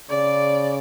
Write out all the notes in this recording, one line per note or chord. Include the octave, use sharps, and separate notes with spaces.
C#3 D5